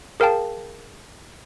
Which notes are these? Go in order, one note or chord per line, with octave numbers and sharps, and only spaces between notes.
G#4 A#4 F5 G5 A5